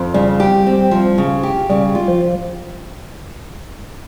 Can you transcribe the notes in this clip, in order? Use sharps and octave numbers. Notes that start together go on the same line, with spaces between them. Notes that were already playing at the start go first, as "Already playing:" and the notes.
Already playing: F2
C#3 G3
G4
C4
F3
C#3
G4
C#3 G3
F4
F3